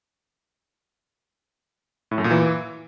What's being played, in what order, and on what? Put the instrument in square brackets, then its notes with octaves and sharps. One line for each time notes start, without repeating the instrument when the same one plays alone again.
[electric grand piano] A2
F#2
A#2
E3